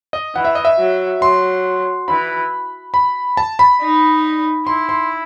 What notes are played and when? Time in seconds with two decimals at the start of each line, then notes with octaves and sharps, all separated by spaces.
0.13 D#5
0.35 E3 F#5
0.45 E5
0.55 D#5
0.65 E5
0.78 F#3
1.21 F#3 C6
2.08 E3 B5
2.94 B5
3.37 A5
3.59 B5
3.81 D#4
4.67 E4 C6
4.89 C6